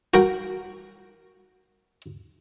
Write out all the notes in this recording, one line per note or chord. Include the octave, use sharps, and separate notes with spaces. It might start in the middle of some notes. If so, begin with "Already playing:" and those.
F#4 A#4 G5